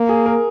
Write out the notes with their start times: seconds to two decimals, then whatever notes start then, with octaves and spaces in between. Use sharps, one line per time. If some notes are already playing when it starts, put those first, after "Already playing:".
Already playing: A#3
0.09 G#4
0.26 A#4